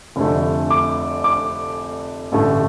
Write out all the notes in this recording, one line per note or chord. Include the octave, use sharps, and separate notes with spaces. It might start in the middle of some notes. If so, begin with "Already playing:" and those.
F1 F2 D3 A3
D6
D6
A1 G2 D3 A3